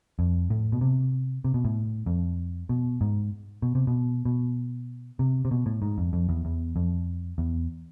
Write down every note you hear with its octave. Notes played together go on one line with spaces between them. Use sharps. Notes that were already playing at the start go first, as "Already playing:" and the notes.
F2
A2
B2
C3
C3
B2
A2
F2
B2
G#2
B2
C3
B2
B2
C3
C3
B2
A2
G#2
F2
F2
E2
E2
F2
E2